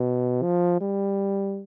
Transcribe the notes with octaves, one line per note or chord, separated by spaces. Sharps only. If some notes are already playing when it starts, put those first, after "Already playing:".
Already playing: B2
F3
G3